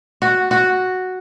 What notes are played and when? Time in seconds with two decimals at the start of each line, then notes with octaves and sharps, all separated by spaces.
0.22 F#4
0.51 F#4